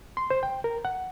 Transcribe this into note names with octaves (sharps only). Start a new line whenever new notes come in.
C6
C5
G5
A#4
F#5